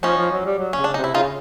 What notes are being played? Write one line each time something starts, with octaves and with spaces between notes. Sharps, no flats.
F3 C#4 D#4
F3
F#3
G3
F#3
C#3 C#4
D4
C3 D#4
E4
C#3 D#4 F4